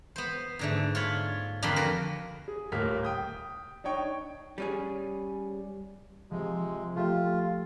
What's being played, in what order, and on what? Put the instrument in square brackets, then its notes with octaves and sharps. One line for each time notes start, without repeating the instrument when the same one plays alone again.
[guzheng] B3 C5
G#2 D3 A3
F4 C#5 B5
F2 D3 A#3 B4 B5 C6
F#4 A#4 B4
[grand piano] G#4
D#1 A2 A#3 F6 B6
G5 D#6 G6
D4 D#4 C#5 G5 C#6
[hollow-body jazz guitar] G3 C#4 G#4
[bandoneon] C3 G#3 [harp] F3
[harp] A3 G4 E5 [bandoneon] F4